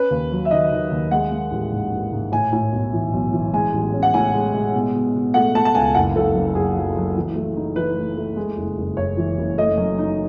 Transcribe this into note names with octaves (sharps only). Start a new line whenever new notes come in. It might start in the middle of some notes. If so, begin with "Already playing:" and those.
Already playing: C#4 B4
D#2
F#3
E5
D#3 D#5
D#3
D#2
G#3 F#5
G#3
A1
G#2
A1
G#2
A2 G#5
A2
B1
E3
B1
E3
G#3 G#5
A1
C#4
F#5
A2 G#5
G#3
G#3
B2
B2
B2
A3 F#5
A3 A5
A5
C#2 G#5
F#1 F#5
F#2 A4
F#2
F#2 G#4
F#3
F#3
E3
A3
D#4
E3 B4
A3
A3
G#3
F#1
F#1
F#1 C#5
E3
F#1
A3 D#5
F#2
D#4